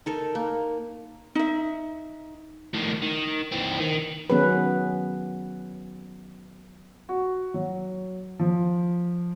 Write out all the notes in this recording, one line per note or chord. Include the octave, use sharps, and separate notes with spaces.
D#4 A4 A#4
A#3
D#4 E5
A2 D#3
D#3
E3 C4
D#3
D#3 F#3 B3 C#4 G#4 B4
F#4
F#3
F3